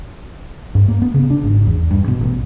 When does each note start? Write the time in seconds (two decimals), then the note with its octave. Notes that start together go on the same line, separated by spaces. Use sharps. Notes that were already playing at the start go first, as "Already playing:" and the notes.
0.75 G2
0.88 A#3
1.02 B3
1.14 C#3
1.30 D4
1.43 G#1
1.67 E2
1.91 G2
2.08 B2
2.21 A1